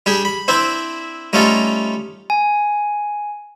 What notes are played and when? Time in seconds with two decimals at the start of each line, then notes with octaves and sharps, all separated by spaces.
0.06 G3 D4 G4 G#4
0.25 B5
0.48 C4 D4 E4 C5 E5
1.33 G3 A3 C#4 D#4 F4 A4
2.30 G#5